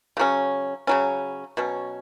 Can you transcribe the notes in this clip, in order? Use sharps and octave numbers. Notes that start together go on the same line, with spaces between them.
C#3 F#3 C#4
C#3 F#3 C#4
B2 F#3 C#4